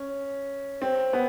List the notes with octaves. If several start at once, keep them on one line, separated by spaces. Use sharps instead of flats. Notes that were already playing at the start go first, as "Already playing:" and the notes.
Already playing: C#4
C4
B3